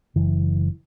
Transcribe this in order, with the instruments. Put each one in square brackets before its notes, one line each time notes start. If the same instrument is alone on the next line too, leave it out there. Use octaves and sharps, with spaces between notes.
[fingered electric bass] F#1 E3